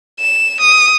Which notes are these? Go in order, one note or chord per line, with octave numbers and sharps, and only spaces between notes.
E7
D#6